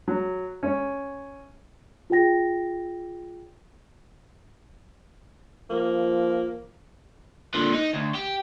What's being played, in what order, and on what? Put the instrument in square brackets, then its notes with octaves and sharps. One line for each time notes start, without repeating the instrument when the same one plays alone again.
[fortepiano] F#3
C#4
[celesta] F4 G#4 G5 A#6
[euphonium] F3 [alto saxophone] A#3
[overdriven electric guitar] A#2 D3
D#4
D2
G4